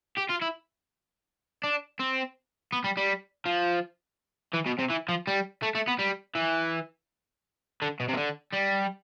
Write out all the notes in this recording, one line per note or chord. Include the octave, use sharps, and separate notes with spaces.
G4
F4
E4
D4
C4
B3
G3
G3
F3
E3
B2
C3
E3
F3
G3
A3
A3
B3
G3
E3
D3
B2
C3
E3
D3
G3